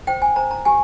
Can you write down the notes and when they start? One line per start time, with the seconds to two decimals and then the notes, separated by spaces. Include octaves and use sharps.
0.07 C5 G5
0.22 G#5
0.36 C5 A#5
0.51 A#5
0.65 G4 G#5